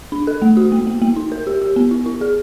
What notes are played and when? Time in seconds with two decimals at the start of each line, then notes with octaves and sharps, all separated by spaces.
0.12 D4
0.27 A4
0.42 A3
0.57 F#4
0.72 A#3
0.87 A#3
1.02 A#3
1.16 D#4
1.32 A#4
1.47 G4
1.62 G4
1.76 B3
1.91 E4
2.06 E4
2.21 G#4